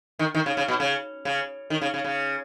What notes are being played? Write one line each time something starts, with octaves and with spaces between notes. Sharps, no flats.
D#3
D#3
C#3
C#3
B2
C#3
C#3
D#3
C#3
C#3
C#3